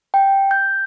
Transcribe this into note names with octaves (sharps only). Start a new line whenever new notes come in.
G5
G6